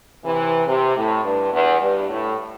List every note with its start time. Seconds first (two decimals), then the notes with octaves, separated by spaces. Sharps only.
0.24 C3 E3
0.67 C3
0.96 A2
1.24 G2
1.52 E2
1.80 G2
2.09 A2